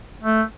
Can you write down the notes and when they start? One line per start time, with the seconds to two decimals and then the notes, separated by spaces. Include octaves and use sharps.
0.23 A3